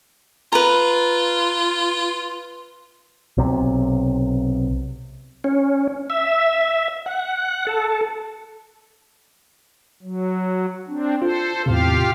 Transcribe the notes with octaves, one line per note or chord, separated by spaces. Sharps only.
F4 B4 A#5
B1 C3
C#4
E5
F#5
A4
F#3
C4 D4
F4 A4 C5
E2 A2 C3 F4 G4 F5